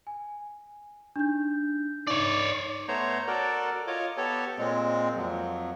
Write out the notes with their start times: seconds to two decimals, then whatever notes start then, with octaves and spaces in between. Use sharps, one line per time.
0.07 G#5
1.16 D4 D#4 G6
2.07 D#4 C#5 D5
2.88 A3 B3 C5 C#5 A#5
3.27 F#4 A4 A#4 D5
3.87 F4 C#5 D#5 D6
4.17 B3 G4 A4 C#5
4.58 A#2 G#3 C4
5.16 F2 F3 F#3